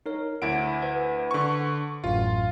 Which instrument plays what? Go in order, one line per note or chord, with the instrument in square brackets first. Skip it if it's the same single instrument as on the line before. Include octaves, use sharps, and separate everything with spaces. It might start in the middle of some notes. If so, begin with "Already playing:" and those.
[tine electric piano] D#4 A#4 C#5
[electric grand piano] D2 E4 D7 [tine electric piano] F#5
[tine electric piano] B4 C5 F#5
[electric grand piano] D3 C#6
[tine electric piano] A1 F#2 A2 [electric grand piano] F4